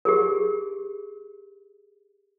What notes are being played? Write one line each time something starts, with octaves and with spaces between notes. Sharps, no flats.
G4 G#4 A#4